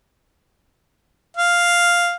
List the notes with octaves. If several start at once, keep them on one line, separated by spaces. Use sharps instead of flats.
F5